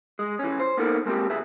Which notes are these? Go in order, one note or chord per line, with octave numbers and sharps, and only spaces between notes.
G#3
E3 C#4
C5
A#3 B3 D#4 A4 A#4
G#3 A#3 C4 G4
D2 G#4 B4 E5